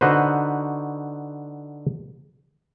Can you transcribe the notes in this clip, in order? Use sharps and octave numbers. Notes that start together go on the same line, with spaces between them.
D3 D#4 F#4 B4 C5